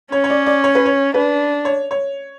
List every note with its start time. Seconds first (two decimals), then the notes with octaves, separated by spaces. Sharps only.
0.12 C#4 C#5
0.24 C#5
0.30 D5
0.46 D5
0.64 C#5
0.75 B4
0.86 C#5
1.14 D4 B4
1.65 C#5
1.91 C#5